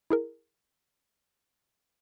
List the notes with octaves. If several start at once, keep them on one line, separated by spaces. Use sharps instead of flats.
E4 G#4 A#4